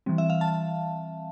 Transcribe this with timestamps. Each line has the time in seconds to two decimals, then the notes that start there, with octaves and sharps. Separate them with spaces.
0.06 E3 G3 C4
0.18 E5
0.30 F5
0.41 A5